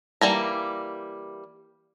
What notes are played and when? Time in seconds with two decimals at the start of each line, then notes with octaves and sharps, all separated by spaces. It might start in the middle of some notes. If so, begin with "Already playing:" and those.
0.21 E3 G3 A#3 A#5